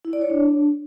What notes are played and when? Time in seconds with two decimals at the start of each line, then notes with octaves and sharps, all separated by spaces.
0.05 E4
0.13 D5
0.22 C#5
0.30 D4